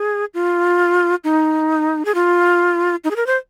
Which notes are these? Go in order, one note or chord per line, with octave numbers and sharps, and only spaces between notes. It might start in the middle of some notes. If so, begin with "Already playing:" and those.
Already playing: G#4
F4
D#4
G#4
F4
D#4
G#4
A#4
C5